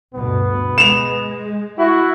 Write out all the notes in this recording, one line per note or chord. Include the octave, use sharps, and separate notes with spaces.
D2 G2 B2 B3
G#3 E7 F7
E4 F#4